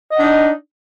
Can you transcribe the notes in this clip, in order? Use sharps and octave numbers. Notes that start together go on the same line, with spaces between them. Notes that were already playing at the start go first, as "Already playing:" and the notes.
D4 D#4 D#5 F#5